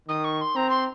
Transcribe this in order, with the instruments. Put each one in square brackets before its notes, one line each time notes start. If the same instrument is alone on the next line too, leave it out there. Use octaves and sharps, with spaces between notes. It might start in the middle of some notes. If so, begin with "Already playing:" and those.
[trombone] D#3 [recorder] D#6
[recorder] C#6
C6
[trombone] C4 [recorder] A#5
[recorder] C6